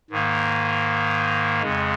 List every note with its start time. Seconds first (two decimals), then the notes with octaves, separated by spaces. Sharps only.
0.10 G#2 D#3 A#3
1.62 F2 C#3 G#3